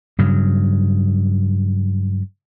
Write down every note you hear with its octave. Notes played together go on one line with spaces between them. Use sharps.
G2 C#3 F#3